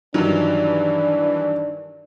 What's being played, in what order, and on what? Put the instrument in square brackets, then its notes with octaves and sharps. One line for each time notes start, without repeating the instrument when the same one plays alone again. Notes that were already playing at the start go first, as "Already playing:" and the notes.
[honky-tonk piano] G2 F#3 [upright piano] D#3 [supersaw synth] E3 [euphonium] D4